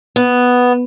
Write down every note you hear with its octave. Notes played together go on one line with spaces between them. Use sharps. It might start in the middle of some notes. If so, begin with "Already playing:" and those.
B3